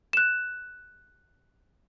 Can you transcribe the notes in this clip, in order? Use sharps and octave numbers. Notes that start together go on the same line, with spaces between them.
F#6 E7